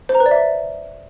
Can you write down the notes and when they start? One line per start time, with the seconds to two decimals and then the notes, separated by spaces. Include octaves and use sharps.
0.09 C5
0.15 A#5
0.20 B4
0.26 D5
0.31 E5